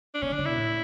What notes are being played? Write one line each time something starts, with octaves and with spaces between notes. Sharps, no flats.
D4
B2 C#4
D3
D4
C#3
B2 E4
A2